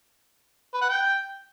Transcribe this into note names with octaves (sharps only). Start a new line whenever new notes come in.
B4
F#5
G5